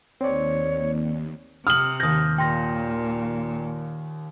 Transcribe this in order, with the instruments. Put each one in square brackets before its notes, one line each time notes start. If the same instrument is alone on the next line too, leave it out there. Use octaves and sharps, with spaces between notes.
[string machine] D#2 [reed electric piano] C4 D5 [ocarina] C#5
[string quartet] C3 [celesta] D#6 [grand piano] F6 F#7
[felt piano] D#2 G6 [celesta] D#6 A#6
[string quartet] A#2 [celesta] G5 C6 A#6